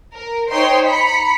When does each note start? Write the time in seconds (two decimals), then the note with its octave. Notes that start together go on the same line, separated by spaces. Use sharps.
0.14 A#4
0.50 D#4 C5 C#5 D#5 G5 C6
0.87 A#5 B5 B6 C#7